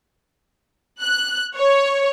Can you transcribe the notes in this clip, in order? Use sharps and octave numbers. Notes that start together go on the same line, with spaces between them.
F#6
C#5